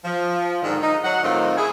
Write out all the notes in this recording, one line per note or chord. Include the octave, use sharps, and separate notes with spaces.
F3
G#2 D3 D#3
D#4
F#3 F#5
A2 D#3 C4 D#4 F4
E4 G#4